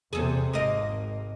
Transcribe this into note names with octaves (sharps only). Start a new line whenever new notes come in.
E2 C3 G#4 A4
G#1 G#3 A#3 D#5